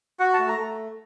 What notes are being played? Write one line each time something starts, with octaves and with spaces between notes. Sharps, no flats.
F#4 F#5
A5
A3
A#5
A3